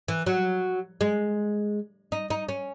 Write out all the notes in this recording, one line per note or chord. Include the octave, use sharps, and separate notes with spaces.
E3
F#3
G#3
D#4
D#4
C#4